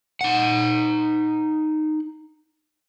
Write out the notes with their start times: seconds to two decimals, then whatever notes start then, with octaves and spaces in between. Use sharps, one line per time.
0.21 D#4 F#5